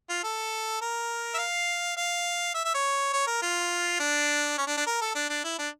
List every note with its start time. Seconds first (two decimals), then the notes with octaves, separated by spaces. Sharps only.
0.09 F4
0.24 A4
0.82 A#4
1.34 E5
1.38 F5
1.97 F5
2.55 E5
2.65 E5
2.75 C#5
3.13 C#5
3.27 A#4
3.42 F4
4.00 D4
4.58 C#4
4.67 D4
4.77 D4
4.87 A#4
5.01 A4
5.15 D4
5.30 D4
5.44 E4
5.59 D4